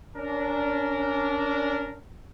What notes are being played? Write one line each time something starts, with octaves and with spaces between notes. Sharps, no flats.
C#4 D4 A#4